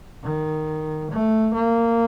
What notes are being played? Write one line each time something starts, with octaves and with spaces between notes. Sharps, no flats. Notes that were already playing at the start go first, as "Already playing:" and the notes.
D#3
A3
A#3